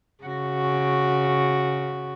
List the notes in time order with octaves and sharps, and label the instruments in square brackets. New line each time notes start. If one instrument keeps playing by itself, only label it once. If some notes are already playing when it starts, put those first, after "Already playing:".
[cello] C#3 F#4